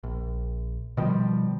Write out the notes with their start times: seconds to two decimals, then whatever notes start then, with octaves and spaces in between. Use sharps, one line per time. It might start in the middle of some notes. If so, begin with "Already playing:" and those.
0.03 A#1
0.97 B2 D#3 F3 G3